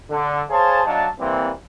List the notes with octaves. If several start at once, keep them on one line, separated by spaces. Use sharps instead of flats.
D3
G#4 C5 C#5 F5 G#5 A5
F#3 D4 D#5 F5 A5
C3 E3 G3 A#3 C4